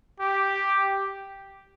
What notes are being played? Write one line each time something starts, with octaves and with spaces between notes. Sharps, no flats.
G4